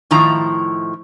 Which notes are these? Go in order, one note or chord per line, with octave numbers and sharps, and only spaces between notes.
A2 D#3 F3 E4 A#5